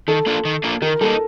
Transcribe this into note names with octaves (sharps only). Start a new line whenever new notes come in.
D#3 A4
A#3 D4 F4
D#3
A#3 D4 F4
D#3 A#4
G3 A#3 D#4 A4